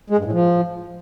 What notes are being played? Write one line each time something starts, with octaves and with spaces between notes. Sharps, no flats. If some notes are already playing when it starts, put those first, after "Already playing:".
G#3
G2
A2
F3